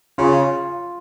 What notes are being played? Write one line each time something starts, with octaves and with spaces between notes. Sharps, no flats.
C#3 F4